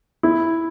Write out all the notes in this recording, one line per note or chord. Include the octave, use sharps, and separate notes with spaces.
E4